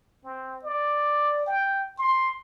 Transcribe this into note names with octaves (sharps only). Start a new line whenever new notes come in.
C4
D5
G5
C6